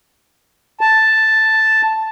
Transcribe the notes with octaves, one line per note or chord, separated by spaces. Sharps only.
A5